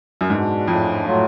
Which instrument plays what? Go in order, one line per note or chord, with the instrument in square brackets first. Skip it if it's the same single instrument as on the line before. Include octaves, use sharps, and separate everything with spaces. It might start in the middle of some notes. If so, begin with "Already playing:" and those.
[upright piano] F#2
[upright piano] G#2 [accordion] B2 G#3 D4
[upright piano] F2 [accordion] A2 F3 G#3 D4
[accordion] A2 F#3 A3 F4